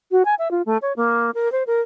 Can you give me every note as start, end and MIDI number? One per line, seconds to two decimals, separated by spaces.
0.11 0.23 66
0.25 0.35 80
0.39 0.51 76
0.51 0.62 65
0.66 0.78 57
0.82 0.93 73
0.96 1.31 58
1.35 1.51 70
1.52 1.63 72
1.67 1.81 70